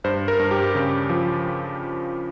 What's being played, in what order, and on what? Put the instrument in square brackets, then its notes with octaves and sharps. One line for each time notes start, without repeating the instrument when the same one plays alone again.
[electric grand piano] G2 C5
A#4
G2
G4
C#3
F3